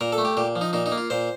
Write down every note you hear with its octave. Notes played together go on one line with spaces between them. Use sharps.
A#2 A#4
A4
A3
G4
A#2 G4
F3
D#4
A#2 D#4
D#4
A#3
F4
A#2 C5